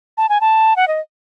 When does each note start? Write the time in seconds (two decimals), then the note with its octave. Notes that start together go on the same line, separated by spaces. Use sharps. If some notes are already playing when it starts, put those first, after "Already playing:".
0.17 A5
0.29 G#5
0.41 A5
0.76 F#5
0.88 D#5